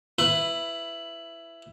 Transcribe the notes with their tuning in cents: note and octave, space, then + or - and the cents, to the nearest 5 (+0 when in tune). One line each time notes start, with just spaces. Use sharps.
E4 +15 B4 +10 B5 +0